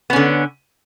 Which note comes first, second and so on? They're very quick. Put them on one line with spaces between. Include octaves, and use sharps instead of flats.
B3 C#4 D3